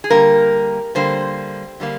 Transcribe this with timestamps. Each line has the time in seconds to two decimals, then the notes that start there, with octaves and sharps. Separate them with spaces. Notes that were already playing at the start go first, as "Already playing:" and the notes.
0.04 G#4
0.10 D3 G3 A#3 A#4
0.95 D3 G3 A#3 C5
1.80 D3 G3 A#3